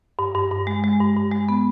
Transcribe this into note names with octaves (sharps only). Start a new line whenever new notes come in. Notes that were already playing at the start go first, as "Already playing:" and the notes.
G2
G2
G2
G#3
G#3
G2
G2
G#3
B3